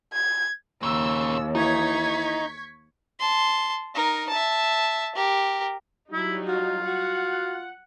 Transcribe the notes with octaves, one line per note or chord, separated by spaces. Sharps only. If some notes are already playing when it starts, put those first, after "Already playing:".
G#6
D#2 A#2 C#3 E6
E3 D#4 C#6 G#6 B6
A5 C6
D#4 A#4
E5 A5
G4 A#4
F#3 G3 D#4 E4
F4 F#4
F#4 F#5